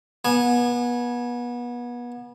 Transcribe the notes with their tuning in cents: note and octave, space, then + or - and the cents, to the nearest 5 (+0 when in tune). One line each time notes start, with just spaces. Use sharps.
B3 -30 G#5 +0